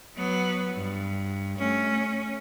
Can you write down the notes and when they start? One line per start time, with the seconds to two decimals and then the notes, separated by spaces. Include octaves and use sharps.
0.17 F#3 B3
0.75 G2
1.59 A3 C#4